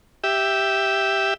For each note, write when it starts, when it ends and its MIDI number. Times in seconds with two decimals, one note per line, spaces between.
0.24 1.34 67
0.24 1.34 76